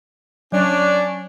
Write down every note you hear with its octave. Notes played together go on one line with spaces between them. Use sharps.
F#3 C#4 D4